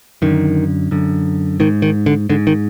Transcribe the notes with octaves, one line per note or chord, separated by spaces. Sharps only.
F#2 D3 D#3
F#2 D3
G#2 D#3
D#3
D3
G#2 D3
D#3